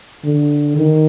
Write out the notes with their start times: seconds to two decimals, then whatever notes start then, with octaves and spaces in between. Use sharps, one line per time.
0.25 D3
0.77 D#3